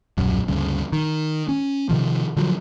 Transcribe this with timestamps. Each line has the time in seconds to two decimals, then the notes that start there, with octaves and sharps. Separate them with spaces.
0.18 D#1 B1 F#2
0.48 D2 G2 C#3
0.93 D#3
1.49 C#4
1.89 C3 D#3 F3
2.37 D3 F3 F#3